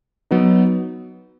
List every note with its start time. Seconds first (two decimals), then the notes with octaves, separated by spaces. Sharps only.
0.31 F#3 B3 D#4